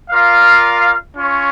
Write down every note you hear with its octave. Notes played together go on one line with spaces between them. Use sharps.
F4 A#4 D5 F5
C#4 F4 C#5